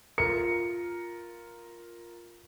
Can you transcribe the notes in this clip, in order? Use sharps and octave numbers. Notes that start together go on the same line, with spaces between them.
F4 A#4 C#7